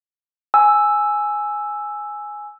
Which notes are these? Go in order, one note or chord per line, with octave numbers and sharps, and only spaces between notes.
G#5 E6